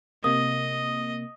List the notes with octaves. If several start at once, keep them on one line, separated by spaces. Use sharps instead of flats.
C3 A#3 D#5 D#6